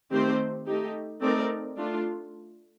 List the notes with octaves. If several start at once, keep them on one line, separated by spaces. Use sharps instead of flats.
D#3 A3 C4 G4 C5
A3 D#4 G4
A3 C4 D#4 A#4 D5
A3 D4 F4